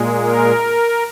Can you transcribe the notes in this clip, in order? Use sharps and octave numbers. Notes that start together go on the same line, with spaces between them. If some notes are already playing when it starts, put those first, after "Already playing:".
Already playing: A#2 G#3
A#4